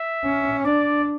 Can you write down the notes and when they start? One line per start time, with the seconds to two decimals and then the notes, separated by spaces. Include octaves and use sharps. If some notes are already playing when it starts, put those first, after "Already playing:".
Already playing: E5
0.25 C#4
0.65 D4 D5